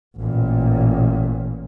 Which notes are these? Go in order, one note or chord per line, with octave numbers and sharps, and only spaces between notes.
A1 A#2